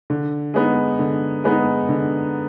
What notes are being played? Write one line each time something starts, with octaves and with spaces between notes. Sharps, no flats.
D3
G#3 B3 D#4
D3
G#3 B3 D#4
D3